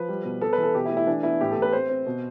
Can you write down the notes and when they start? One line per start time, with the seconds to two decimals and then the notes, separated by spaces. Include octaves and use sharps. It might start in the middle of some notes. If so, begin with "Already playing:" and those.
Already playing: F3 B4
0.09 G3
0.25 B2
0.41 B3 A4
0.53 B4
0.58 E3
0.63 A4
0.75 B2 G4
0.86 E4
0.91 A3
0.97 E4
1.07 E3 D4
1.23 B3 E4
1.41 A2 G4
1.51 A4
1.57 A2
1.62 B4
1.73 C4 C5
1.89 C4
2.06 B2